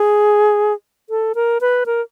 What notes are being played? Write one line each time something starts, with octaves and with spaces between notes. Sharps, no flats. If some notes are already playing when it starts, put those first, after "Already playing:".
Already playing: G#4
A4
A#4
B4
A#4